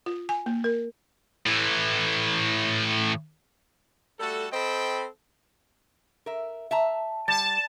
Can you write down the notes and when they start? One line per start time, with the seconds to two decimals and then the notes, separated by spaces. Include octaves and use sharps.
0.06 F4
0.29 G#5
0.46 A#3
0.64 A#4
1.46 A2 E3
4.20 G3 A3 F#4 A4
4.53 C4 A4 C5 D#5 G5 B5
6.26 A#4 E5
6.71 E5 A5 A#5
7.28 G3 A5